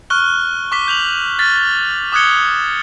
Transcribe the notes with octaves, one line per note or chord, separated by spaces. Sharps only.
C#6 F6 F#6 G7
C#6 D6 B6 G7
G6 F7 F#7
F6 A6 B6
D6 D#6 F#6 G#6 C#7 G7